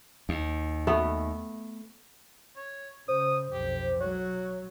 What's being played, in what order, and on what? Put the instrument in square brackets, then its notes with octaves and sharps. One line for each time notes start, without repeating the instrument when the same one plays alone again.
[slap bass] D#2
[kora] A3 B3
[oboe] C#5
[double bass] C#3 [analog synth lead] C5 [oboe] D#6
[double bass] B1 F2 [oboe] G4
[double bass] F#3 [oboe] F#4 [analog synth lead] C#5